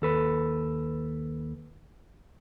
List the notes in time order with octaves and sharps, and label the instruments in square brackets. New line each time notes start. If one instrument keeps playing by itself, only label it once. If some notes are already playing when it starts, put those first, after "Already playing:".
[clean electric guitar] D#2 A4 B4